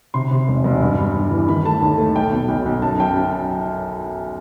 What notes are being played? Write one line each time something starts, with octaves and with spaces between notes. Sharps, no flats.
C3 C6
C3
E1
E1
G2
G3
G2
E3
D#3 B5
A3 A5
D#2
A3
B1 G5
B2
B1 G5
B1
F#2 A5
F#2 G5
F#2 G5